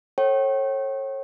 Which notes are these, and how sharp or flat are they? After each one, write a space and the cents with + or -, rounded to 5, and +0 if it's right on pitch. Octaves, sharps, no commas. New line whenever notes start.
A4 +0 C#5 -35 G5 -40